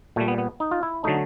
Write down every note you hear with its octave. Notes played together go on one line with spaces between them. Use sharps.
A#2 G3 A3
B3
B3
D#4
F4
E4
D3 F#3 A3 D#4